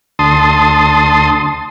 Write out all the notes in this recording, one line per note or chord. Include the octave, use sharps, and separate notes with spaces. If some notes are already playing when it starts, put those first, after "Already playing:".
D2 A5 C6 D#6